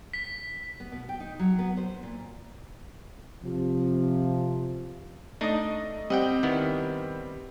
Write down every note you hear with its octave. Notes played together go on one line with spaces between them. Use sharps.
B6
B3
B2
G5
D#4
F#3
B3
C5
A#2
C3 F3
A3 D4 D#4 D#5
G3 C4 D#5 F#5 G5
D#3 B3 E4